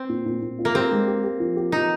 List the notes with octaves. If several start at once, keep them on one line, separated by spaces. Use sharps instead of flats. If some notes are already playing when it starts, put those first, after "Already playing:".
Already playing: C4
A#2
A#2
A#2
F4
A#3
C4 G4
G#3
G4
G4
F3
G4
F3 D#4